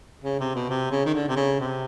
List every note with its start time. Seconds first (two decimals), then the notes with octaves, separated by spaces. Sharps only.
0.24 C#3
0.40 C3
0.55 B2
0.69 C3
0.91 C#3
1.06 D#3
1.15 D3
1.29 C3
1.36 C#3
1.60 C3